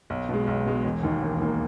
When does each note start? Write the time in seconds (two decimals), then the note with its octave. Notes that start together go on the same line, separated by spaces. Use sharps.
0.10 B1
0.29 B2 G#3
0.47 B1
0.66 B2 G#3
0.84 E1
1.03 D#2 D#3 A#3
1.22 E1
1.41 D#2 D#3 A#3